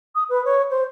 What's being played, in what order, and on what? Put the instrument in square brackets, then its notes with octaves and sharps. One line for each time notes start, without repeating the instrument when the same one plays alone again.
[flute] D#6
B4
C#5
C5